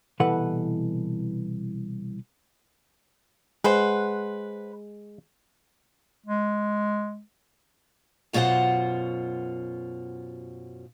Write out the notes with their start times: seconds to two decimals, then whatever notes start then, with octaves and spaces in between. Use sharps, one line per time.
0.20 C2 B2 E3 A4 B4 F#5
3.64 G#3 B4 C5 F#5
6.26 G#3
8.33 F#2 B2 F4 G#4 C5 F#5